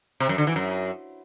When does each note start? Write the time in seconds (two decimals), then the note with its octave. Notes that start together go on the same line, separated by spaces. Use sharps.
0.20 C3
0.29 F#2
0.38 D3
0.47 E3
0.56 F#2